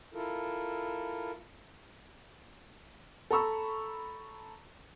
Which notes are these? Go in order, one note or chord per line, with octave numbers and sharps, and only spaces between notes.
E4 F4 A4 A#4
A4 A#5 B5 C#6 E6